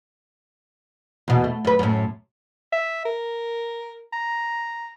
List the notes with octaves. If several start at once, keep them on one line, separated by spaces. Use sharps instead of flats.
E2 B2
A3
F#2 B4
F#2 A2
E5
A#4
A#5